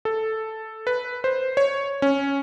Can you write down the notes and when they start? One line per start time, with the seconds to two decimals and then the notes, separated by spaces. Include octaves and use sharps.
0.05 A4
0.87 B4
1.24 C5
1.57 C#5
2.02 C#4